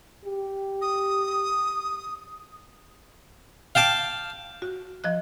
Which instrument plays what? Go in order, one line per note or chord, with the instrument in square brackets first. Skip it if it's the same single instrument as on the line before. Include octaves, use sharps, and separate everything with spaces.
[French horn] G4
[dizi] D#6
[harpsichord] F5 G5 A5 D6
[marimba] F#4
F3 D#5 F#6